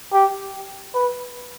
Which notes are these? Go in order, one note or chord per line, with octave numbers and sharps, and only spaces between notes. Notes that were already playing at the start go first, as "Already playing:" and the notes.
G4
B4